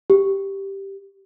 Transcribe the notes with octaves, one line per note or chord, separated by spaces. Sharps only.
G4